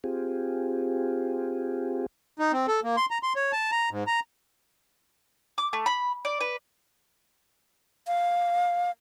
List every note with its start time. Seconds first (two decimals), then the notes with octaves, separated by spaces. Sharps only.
0.04 C4 F4 G4 G#4
2.39 D#4
2.52 C4
2.68 A4
2.84 A#3
2.97 C6
3.11 A#5
3.23 C6
3.36 C#5
3.52 A5
3.72 A#5
3.91 G#2
4.07 A#5
5.58 D6
5.73 A3
5.86 B5
6.25 D5
6.41 B4
8.07 F5